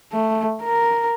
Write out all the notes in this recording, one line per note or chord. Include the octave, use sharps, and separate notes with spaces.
A3
A#4